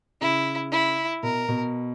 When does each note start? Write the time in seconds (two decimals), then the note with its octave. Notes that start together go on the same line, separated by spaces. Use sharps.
0.21 C#3 E4
0.72 E4
1.23 B2 A#4
1.49 B2